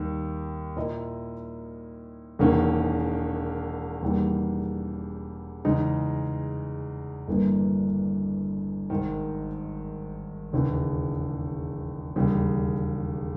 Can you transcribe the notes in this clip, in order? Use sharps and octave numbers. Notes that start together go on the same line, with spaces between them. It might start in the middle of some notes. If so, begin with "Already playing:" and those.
Already playing: D#2 D#3 G3
A#2 A#3 E4 A#4 D#5
E1 E2 D#3 A#3 C#4
E1 E2 D#3 G3 A#3
E2 C#3 G#3 D#4
G1 G2 E3 A#3
G#1 G#2 D#3
E1 D#2 C#3 E3
E1 D#2 C#3 G3